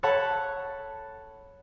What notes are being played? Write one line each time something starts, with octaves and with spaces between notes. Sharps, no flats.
A4 C#5 F#5 A5 B5